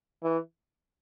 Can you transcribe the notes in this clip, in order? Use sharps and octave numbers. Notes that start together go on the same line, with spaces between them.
E3